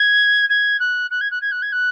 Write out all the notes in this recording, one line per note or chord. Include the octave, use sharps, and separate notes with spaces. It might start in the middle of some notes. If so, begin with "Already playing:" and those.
Already playing: G#6
G#6
F#6
F#6
G#6
F#6
G#6
F#6
G#6
F#6